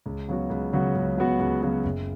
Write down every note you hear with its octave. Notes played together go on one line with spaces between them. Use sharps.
C#2
C#3 F#3 B3 F#4
C#2
C#3 F#3 B3 F#4
C#2
C#3 F#3 B3 F#4
C#2
C#3 F#3 B3 F#4
F#1